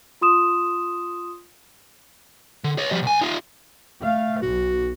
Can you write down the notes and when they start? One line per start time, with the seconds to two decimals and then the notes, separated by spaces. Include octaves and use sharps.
0.21 F4 C6 D#6 E7
2.64 D3
2.78 C#5 D#5
2.91 F3 G3
3.03 C2 G#5
3.21 D#4 F4
4.03 A3 F5
4.42 B1 F#4